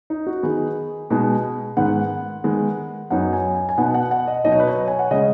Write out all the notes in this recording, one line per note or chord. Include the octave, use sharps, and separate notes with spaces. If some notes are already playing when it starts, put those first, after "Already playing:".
D#4
F#4
D#3 B3 D#4 G#4
B2 G#3 B3 D#4
G#2 D#3 B3 F#5
D#3 G#3 B3
F#2 F#3 B3 D#4 F#5
G#5
G#5
G#5
B2 B3 D#4 F#5
F#5
F#5
D#5
B2 F#3 D#4 D#5
C#5
B4
C#5
G#5
F#5
C#3 G#3 C#4 D#5